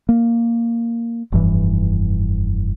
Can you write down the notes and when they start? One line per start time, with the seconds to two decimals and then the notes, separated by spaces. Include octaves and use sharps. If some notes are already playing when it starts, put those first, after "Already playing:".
0.09 A#3
1.32 F1 G2 E3